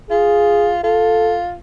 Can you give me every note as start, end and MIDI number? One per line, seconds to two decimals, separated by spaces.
0.11 0.82 65
0.11 0.73 68
0.84 1.54 65
0.84 1.38 69